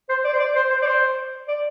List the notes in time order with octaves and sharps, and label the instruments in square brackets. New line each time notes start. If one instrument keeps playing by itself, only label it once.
[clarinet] C5
D5
C5
D5
C5
C5
D5
C5
D5